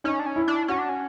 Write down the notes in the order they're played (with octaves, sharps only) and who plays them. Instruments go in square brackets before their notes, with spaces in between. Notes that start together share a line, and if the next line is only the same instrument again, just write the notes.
[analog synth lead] C#4 [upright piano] D#4
[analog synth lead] D4
C#4
[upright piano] E4
[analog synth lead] D4
[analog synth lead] C#4 [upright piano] F#4
[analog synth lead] D4
C#4